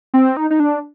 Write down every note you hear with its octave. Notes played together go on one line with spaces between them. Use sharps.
C4
D#4
D#4
D4